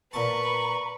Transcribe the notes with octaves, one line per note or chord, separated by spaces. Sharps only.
A#2 B4 A5 A#5 C#6